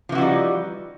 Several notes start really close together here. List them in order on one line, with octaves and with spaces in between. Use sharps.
F3 E3 F#4 G3 D#4